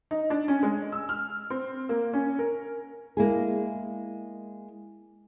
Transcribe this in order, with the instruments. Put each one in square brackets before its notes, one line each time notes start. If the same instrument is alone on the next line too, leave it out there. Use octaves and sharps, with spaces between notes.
[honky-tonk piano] D#4
D4
C#4
G#3
E6
F6
C4
A#3
C#4
A#4
[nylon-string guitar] G#3 A#3 E4 G#4